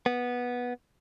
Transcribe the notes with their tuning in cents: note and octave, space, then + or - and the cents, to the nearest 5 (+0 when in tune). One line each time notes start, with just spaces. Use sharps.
B3 -10